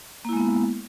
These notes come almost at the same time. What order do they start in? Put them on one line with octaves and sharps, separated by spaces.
A#3 E4 G#3 B3